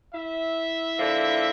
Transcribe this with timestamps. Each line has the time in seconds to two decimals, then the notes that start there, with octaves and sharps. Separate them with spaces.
0.13 E4 E5
0.98 D3 F3 A#3